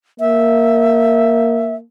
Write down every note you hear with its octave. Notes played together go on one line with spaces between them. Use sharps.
A#3 E5